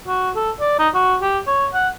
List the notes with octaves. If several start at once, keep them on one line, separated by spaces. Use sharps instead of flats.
F#4
A4
D5
D#4
F#4
G4
C#5
F#5